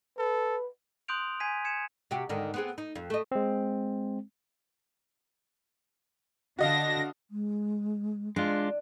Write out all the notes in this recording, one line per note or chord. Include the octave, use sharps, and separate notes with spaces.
A4 B4
C6 D#6 F#6 G6 D7 F7
G#5 G#6 B6 C7 D#7
G#6 C#7 D#7 E7
C3 F#4 G4
G#2 D3 D#3
B3 C4 G#4
D#4
F2
A3 D#5
G#3 C4
D3 D4 F#4 D#5 F5 A#6
G#3
G#3 D4 F4